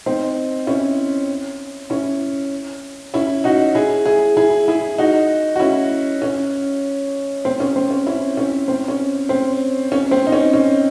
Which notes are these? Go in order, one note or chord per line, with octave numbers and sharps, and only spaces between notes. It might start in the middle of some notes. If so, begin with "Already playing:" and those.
C4 D#4
C#4 E4
C#4 E4
C#4 E4
D#4 F#4
E4 G#4
E4 G#4
E4 G#4
E4 G#4
D#4 F#4
F#4
C#4 E4
C#4
C4
C#4
C4
C#4
C#4 E4
C#4
C4
C#4
C4
C#4
C4
D#4
C#4
C#4